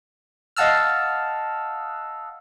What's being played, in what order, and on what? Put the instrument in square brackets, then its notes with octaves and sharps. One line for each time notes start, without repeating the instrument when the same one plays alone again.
[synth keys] D#5 F5 F#5 A5 E6 F6